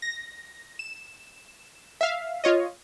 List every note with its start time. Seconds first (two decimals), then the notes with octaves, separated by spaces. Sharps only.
0.02 A#6
0.79 E7
2.01 E5 F5
2.44 F4 C#5 D#5